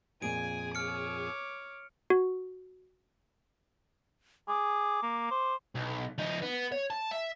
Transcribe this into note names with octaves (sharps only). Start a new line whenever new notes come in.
F2 A#2 G#4 G#5 D7
C#5 D6 F6 C#7
F#4
G#4 D6
A#3
C5
B1
F3 D#4
B3
C#5
A5
E5